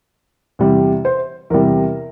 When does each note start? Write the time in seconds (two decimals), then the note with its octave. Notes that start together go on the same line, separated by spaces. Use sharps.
0.59 E2 C3 G3
1.05 C5
1.50 E2 C3 G3 A#4